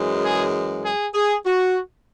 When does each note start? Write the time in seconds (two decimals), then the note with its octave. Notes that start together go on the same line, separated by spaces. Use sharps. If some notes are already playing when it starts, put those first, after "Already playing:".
Already playing: F#2 E3 G#3
0.22 G#4
0.84 G#4
1.15 G#4
1.46 F#4